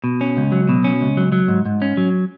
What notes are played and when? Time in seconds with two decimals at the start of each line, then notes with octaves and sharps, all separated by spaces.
0.04 B2
0.21 C#4
0.37 C#2
0.52 F#3
0.69 B2
0.84 C#4
1.01 C#2
1.17 F#3
1.32 F#3
1.48 G#2
1.66 G#2
1.82 C#4
1.97 F#3